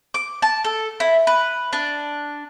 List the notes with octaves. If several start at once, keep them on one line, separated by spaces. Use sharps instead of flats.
D6
A5
A4
E4
B4
D4